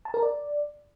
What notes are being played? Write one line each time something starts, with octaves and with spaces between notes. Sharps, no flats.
A5
A#4
D5